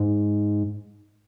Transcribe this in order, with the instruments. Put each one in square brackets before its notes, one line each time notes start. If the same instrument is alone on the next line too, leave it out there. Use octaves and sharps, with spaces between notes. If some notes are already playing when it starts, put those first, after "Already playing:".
Already playing: [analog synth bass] G#2